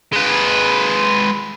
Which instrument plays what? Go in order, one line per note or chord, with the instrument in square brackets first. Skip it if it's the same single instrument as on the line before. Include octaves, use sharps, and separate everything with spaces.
[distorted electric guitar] G#3 B4